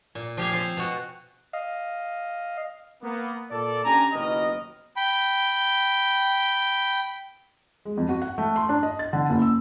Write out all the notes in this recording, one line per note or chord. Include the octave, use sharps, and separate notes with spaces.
A#2
F3 G4 F5 G#5
C4 F4 F5
B2 F#4
D#5 F5
A#3 B3
A#2 A4 D5
C#4 D4 G4 G#5 A#5
F#1 D#2 B2 A#4 D#5
G5 B5
G#3
F2
F#4
F#5
A3
C6
D4
D#5
A6
D3
F#1
E6